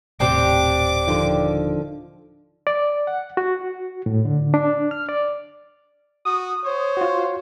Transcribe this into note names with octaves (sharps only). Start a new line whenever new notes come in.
D#1 A2 C3 C4 D4 G4 D6
D3 D#3 F3
D5
F#5
F#4
A2
D3
D4
F6
D5
F#4 D#6
C5 C#5
F4 F#4